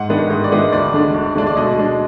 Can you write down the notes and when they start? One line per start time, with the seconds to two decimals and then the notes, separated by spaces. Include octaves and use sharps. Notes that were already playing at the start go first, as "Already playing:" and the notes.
Already playing: G#2 F#5
0.09 D#3 G#3 B3 D4
0.30 G#2 D#5
0.44 D5
0.52 D#3 G#3 B3 D4
0.58 D#5
0.73 D2 D5
0.94 D3 G#3 D4
1.14 D2
1.35 D3 G#3 D4
1.47 D5
1.57 B2 D#5
1.78 G#3 D4